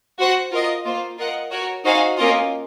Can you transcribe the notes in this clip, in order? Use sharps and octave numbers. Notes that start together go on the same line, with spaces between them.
F#4 C5 F#5
F4 A#4 D#5
A#3 F4 C5
F4 A#4 D#5 F#5
F#4 A#4 C#5
D#4 F#4 C5 F5 G#5
A#3 C#4 F4 A#4 D#5